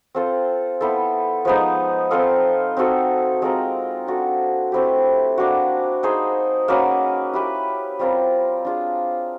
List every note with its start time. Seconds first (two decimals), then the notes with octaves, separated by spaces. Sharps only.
0.15 C4 F4 A4 C5
0.81 B3 E4 A4 C5
1.45 F3 G#3 B3 D#4
2.11 C4 F4 A4
2.77 C4 D#4 F#4 A4
3.42 G#3 C4 F4 A#4
4.07 D4 F#4 A4
4.72 A3 C4 E4 G4
5.38 A#3 D4 F#4
6.03 D#4 G#4 C5
6.68 A#3 C#4 F#4 B4
7.33 E4 G4 B4
7.99 G3 C4 F4 A#4
8.65 D4 F4 G#4